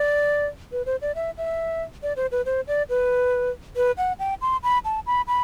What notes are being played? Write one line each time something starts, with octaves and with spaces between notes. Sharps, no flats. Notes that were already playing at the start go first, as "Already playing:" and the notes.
Already playing: D5
B4
C5
D5
E5
E5
D5
C5
B4
C5
D5
B4
B4
F#5
G5
C6
B5
A5
B5
B5